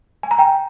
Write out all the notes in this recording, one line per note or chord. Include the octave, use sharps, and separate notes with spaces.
G#5
A#5
G5